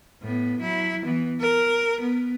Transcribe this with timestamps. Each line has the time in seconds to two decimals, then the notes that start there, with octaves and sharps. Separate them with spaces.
0.23 A2 B3
0.60 F#3 E4
1.04 E3 B3
1.40 A#4
2.00 B3